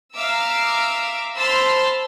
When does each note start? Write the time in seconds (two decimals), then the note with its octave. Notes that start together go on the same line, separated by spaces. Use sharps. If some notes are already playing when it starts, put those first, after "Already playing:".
0.15 E5 F5 A#5 D6 E6
1.37 C5 A5 B5 C6 E6 F6